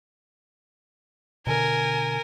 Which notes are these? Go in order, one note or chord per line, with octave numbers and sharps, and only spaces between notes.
B2 D3 A#4 G#5